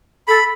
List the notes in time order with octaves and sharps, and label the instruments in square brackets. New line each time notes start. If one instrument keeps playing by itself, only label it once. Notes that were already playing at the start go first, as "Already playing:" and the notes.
[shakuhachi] A4 [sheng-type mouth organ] B5